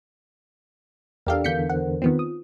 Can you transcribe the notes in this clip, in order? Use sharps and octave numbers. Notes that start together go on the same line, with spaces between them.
E2 D4 G4 A4 A#4 D5 F5
E2 D3 E3 A#4 F5 G6 B6 C#7
A#4 C5 F#5
D#3 B3 C4 F4
D#6